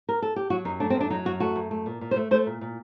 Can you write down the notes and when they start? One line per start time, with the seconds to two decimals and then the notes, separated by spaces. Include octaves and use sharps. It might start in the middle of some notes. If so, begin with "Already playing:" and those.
0.09 A#4
0.22 A4
0.36 G4
0.50 F#3 F#4
0.65 F#2 D#4
0.80 A3 D4
0.90 C4
0.95 F#2
1.00 D4
1.10 F#3 D#4
1.25 F#2 F#4
1.40 A3 F#4
1.56 F#2
1.71 A3
1.86 A#2
2.01 A#2
2.11 C5
2.16 A3
2.31 A3 C5
2.46 A#2
2.61 A#2